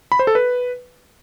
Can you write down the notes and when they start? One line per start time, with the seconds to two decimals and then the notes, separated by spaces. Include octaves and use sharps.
0.12 B5
0.19 C5
0.27 A4
0.35 B4